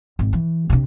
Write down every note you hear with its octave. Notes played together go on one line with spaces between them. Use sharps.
G#1
E3
C3 D4